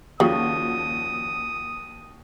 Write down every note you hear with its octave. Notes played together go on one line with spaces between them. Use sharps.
D#2 C#3 F3 G3 F#4 D#6